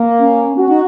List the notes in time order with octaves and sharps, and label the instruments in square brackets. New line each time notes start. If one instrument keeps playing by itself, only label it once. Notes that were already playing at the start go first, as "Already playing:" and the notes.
Already playing: [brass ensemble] A#3
[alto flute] C#4
[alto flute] C#4 [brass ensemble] F#4
[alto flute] D#4